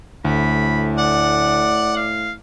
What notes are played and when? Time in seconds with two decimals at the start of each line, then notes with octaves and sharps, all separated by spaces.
0.25 D2 A2 B5
0.98 D5 F#5
1.96 F5